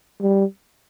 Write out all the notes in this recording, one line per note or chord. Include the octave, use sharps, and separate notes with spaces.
G3